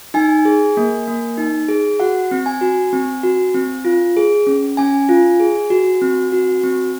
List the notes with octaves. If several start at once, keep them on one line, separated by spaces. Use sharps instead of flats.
D#4 G#5
G#4
A#3
A#3
D#4
G#4
F#4 F#5
C4
G#5
F#4
C4
F#4
C4
F4
G#4
C#4
C#4 G#5
F4
G#4
F#4
C4
F#4
C4